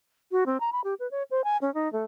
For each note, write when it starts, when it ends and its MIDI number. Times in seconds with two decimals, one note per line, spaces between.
0.32 0.44 66
0.46 0.58 60
0.60 0.70 82
0.72 0.81 83
0.84 0.94 67
1.00 1.10 71
1.11 1.23 73
1.31 1.44 72
1.44 1.57 80
1.62 1.73 61
1.74 1.91 63
1.93 2.04 57